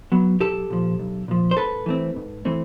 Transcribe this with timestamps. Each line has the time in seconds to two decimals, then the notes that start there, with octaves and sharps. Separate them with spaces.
0.12 F#3 B3
0.40 B1 G4 A4
0.70 A#2 F3
0.99 B1
1.28 A#2 F3
1.51 C5
1.57 G#2 A4 B4
1.86 E3 A3 C4
2.16 G#2
2.45 E3 A3 C4